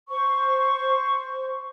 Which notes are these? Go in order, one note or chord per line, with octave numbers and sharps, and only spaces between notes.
C5 C#6